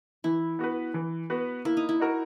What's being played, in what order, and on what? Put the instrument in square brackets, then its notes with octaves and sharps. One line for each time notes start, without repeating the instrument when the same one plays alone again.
[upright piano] E3 [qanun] E4
[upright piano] B3 F#4 B4
E3
B3 F#4 B4
[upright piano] A#3 [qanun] E4
[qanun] D#4
E4
[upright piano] D#4 F#4 A#4